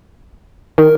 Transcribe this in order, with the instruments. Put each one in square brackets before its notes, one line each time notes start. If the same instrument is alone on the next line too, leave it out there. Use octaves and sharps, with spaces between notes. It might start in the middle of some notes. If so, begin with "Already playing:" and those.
[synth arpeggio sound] D#3 [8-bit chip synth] A#4